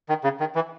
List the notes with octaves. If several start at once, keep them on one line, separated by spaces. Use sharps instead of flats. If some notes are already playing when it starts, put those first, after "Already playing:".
D#3
C#3
D#3
E3